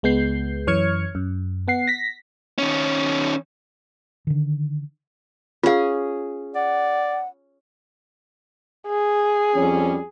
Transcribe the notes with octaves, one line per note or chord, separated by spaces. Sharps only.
C#2 G#3 B3 G6 C7
F#2 E3 C#5 F6 G#6 C#7
F#2
B3 F#5 C7
A#6 B6
D#3 C#4
D3 D#3
C#4 F4 G#4 F5
D5 F#5
G#4
F2 G3 C#4